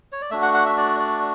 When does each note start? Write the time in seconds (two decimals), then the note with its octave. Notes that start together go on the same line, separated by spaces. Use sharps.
0.12 C#5
0.21 D5
0.31 A3 D4 F#4 E5
0.42 F#5
0.54 F#5
0.66 E5
0.77 D5
0.99 D5